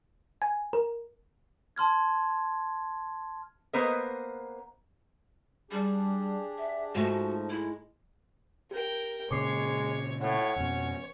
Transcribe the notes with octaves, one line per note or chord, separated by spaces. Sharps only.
G#5
A#4
A5 C6 F6 G#6
A#3 B3 B4 C5 D#5
G3 D4 G4 G#4
E5
G#2 F3 A3 D#4 F#4
G#3 E4
G4 A#4 G5
A#2 C#3 G#3 C#5 C#6 D6 C7
A2 C#5 F#5
F2 B2 C#4